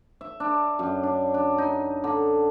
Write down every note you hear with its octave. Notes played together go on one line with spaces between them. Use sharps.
E5
D4
F#2
D4
D4
D#4
D3